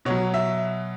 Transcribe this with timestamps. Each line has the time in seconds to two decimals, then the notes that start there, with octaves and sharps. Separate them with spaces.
0.05 B2 F#3 C#5
0.34 E5